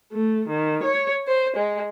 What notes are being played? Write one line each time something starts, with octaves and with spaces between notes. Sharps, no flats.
A3
D#3
C#5
C5
G#3